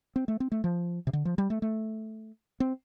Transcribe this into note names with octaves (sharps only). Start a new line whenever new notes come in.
C4
A3
C4
A3
F3
C3
D3
F3
G3
A3
A3
C4